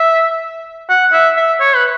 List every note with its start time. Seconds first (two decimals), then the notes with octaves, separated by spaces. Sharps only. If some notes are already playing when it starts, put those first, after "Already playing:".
Already playing: E5
0.90 F#5
1.13 E5
1.37 E5
1.60 C#5
1.75 B4